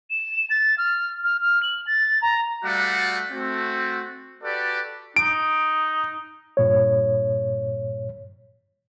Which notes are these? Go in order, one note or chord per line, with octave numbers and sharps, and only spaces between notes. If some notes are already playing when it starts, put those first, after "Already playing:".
E7
A6
F6
F6
F6
F#7
A6
A#5
G3 A3 F#4 D5 F5 F#5
A3 C4 F#4
F#4 G4 A4 B4 D5
D#4 D7
G2 A#2 C#5